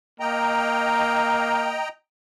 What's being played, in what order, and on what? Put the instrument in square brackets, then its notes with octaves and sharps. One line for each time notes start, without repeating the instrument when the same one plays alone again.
[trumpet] A#3 [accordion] D#5 G5 A#5